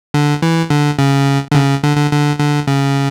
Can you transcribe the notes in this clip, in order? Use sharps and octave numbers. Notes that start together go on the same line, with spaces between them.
D3
E3
D3
C#3
D3
C#3
D3
D3
D3
D3
C#3